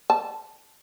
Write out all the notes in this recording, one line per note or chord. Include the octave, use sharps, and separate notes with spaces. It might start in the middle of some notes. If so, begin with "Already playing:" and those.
A5